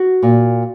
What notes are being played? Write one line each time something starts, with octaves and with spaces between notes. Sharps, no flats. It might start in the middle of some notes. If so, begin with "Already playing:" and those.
Already playing: F#4
A#2